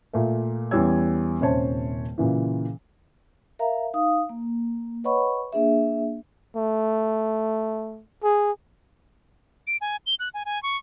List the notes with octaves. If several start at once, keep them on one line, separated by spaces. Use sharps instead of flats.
A#2 A3
E2 G3 C#4 C#5 E6 G#6
D#1 C3 C#4 C5 C#5 A5
A#2 C#3 E3
A#4 E5 F5 A#5
D#4 F5 D#6
A#3
B4 C#5 D#5 F#5 B5 C#6
A#3 D4 G#4 E5
A3
G#4
D7
G#5
G7
F#6
G#5
G#5
C#6